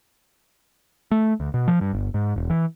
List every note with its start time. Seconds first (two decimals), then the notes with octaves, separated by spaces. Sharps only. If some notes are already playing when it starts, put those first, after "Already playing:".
1.11 A3
1.40 D2
1.54 B2
1.68 F3
1.81 G2
1.93 G1
2.14 G#2
2.36 E1
2.50 E3